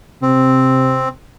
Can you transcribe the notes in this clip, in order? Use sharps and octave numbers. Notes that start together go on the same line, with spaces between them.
C3 C4